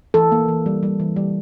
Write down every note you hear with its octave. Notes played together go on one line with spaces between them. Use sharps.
E3 A4
A#3
E3
G3
G3
E3
G3